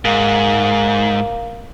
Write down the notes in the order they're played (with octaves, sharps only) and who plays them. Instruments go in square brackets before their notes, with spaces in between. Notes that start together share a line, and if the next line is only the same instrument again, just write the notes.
[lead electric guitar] G#2 [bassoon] A#3